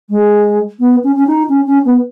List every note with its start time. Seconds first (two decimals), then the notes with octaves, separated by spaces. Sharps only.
0.10 G#3
0.80 B3
1.04 C#4
1.16 C#4
1.27 D#4
1.49 C#4
1.67 C#4
1.85 B3